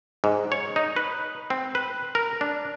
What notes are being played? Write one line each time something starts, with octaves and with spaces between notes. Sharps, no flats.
G#2
C#5
D#4
B4
C4
B4
A#4
D4